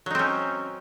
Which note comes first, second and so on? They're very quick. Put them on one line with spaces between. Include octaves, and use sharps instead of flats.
F#3 D#4 C4 C#4